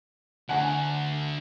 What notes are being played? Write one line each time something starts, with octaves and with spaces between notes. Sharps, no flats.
D2 F#5 G#5